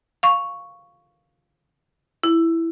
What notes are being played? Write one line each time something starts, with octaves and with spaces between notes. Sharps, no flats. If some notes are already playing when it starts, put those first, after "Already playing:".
F5 C#6
E4